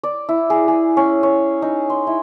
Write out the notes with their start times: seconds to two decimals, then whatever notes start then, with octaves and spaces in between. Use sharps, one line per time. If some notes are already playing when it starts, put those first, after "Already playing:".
0.03 D5
0.29 E4
0.50 G#4
0.68 G#4
0.97 C#4
1.23 C#5
1.62 D#4
1.90 C6
2.07 E4